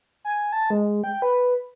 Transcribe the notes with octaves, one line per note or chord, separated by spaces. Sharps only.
G#5
A5
G#3
G5
B4